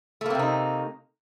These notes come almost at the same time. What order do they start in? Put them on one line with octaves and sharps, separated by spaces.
A3 A#3 C4 C3 D#4